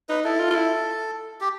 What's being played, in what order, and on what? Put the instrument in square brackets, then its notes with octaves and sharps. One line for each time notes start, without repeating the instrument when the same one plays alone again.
[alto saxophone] D#4 [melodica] B4
[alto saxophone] E4 [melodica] A4
[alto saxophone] F4
F4
E4
[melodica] G4